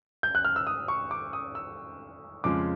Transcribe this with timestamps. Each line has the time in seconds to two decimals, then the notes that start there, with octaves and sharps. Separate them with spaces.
0.23 G6
0.35 F#6
0.45 F6
0.56 E6
0.67 D#6
0.88 C#6
1.11 D6
1.33 D#6
1.55 E6
2.44 F2 C#3 F3 G#3 D6